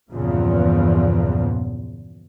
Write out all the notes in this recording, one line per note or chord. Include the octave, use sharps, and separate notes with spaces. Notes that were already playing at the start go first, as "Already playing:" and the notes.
E2 G2 A#2 C#3 F3